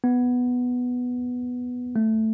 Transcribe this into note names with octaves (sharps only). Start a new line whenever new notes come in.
B3
A3